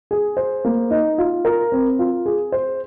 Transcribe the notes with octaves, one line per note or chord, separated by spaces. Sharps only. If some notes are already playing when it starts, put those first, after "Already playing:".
G#4
C5
A#3
D#4
F4
A#4
C4
F4
G#4
C5